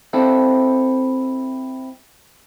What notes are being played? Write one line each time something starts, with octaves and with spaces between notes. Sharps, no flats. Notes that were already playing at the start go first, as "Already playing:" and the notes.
C4 E4 A4